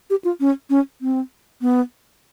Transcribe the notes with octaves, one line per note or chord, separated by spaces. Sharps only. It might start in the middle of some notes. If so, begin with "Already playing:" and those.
G4
F4
C#4
C#4
C4
B3